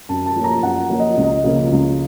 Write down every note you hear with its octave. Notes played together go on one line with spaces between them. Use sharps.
F#2 A5
A5
F3 A#3 C#4
A#5
F#2 F#5
F3 A#3 C#4
D#5
C#2
D#5
C#3 F3 A#3
C#2